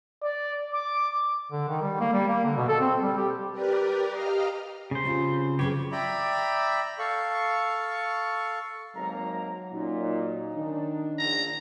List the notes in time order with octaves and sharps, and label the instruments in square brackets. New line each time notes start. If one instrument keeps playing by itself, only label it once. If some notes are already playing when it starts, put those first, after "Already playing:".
[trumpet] D5
D6
[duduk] D3
D#3
G3
A#3
G3
A#3
D3
B2
A4
C4
G3
G4
[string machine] G4 A#4 B4 D5
G4 D#5 F5 A#5 F6
[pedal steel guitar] C#3 C5
[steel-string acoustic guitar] G3 C4 F4
[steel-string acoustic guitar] C#3 F#3 B4 [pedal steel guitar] G4 C#5
[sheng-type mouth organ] D5 E5 G5 A#5 B5
A4 F5 C#6
[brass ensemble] G#1 A#3 A#5 [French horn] F#3
[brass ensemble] A#2 F#4 [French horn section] C#4 D#4
[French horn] D#3 [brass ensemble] D4
[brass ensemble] A#1 [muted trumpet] A#5